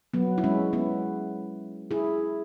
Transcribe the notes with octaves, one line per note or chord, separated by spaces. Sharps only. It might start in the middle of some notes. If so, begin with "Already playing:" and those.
F#3 B3
E4
G#3 C#4
B3 E4
E4 G#4